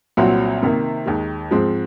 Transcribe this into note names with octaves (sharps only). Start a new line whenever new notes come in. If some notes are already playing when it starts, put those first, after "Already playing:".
C2 A#2 F#3 C4 F#4
C3 D#3 A#3
D#2 D#3 G#3
G#2 F3 G#3 C4